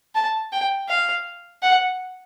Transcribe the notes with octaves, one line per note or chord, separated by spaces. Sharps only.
A5
G5
F5
F#5